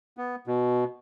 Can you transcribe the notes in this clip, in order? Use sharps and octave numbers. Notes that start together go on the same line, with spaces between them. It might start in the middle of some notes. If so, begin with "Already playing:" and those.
B3
B2